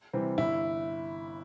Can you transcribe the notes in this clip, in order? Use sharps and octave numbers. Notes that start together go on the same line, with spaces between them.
C3 E3 G3 C4
G1 E4